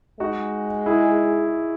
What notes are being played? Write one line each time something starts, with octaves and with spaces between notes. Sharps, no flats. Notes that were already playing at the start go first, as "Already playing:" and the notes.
G#3 D#4 F#4
E4 G#4